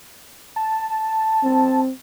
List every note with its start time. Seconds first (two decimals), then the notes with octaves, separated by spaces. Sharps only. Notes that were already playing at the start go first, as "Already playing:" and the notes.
0.56 A5
1.43 C4